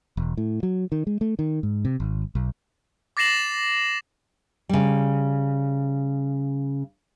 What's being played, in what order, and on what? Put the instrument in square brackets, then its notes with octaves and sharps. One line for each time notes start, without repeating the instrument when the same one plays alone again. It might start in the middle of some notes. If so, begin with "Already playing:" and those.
[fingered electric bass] E1
A2
F#3
D#3
G#3
A3
D#3
G#2
C3
G#1
B1
[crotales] D6 A6 A#6 C7 E7 F#7
[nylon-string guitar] C#3 G3